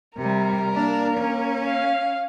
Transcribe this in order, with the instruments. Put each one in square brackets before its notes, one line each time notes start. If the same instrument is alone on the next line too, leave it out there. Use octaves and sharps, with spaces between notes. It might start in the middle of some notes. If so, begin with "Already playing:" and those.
[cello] C3 G3 [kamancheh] A#4
[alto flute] A#3 [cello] D4
[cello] C#4
[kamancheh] F5